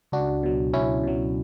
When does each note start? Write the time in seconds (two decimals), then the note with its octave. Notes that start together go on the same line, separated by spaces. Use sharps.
0.12 C#2 D4 F#4
0.43 B2 F#3
0.74 C#2 C#4 E4
1.03 B2 F#3